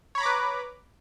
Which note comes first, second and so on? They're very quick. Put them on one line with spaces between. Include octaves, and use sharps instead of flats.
C#5 B5 A#5 D6 B4